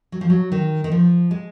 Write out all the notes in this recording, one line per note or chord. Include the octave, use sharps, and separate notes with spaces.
F#3
F3
F#3
D#3
D#3
F3
G#3